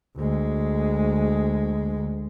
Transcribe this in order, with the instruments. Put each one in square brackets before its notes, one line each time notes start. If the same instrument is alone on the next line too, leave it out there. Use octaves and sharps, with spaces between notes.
[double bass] D2 G#3